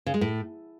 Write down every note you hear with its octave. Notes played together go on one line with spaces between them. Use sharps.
C#3
G#3
A2